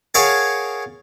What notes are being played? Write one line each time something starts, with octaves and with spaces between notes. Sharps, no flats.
G#4 A#4 C#5 F5 F#5 A5